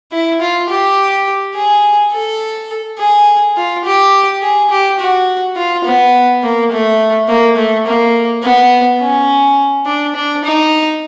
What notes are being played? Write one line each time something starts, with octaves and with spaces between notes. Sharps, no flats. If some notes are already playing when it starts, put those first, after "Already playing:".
E4
F4
G4
G#4
A4
G#4
F4
G4
G#4
G4
F#4
F4
B3
A#3
A3
A#3
A3
A#3
B3
C#4
D4
D4
D#4